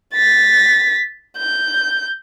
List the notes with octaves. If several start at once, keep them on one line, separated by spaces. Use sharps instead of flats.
A6 B6
G6